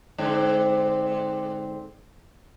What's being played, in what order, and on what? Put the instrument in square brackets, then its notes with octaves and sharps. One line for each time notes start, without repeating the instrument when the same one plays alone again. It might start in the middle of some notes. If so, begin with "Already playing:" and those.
[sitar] G#2 D3 C4